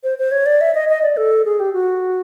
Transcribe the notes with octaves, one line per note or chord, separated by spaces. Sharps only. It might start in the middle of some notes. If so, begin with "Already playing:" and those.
C5
C5
C#5
D5
E5
D#5
D#5
D5
A4
G#4
G4
F#4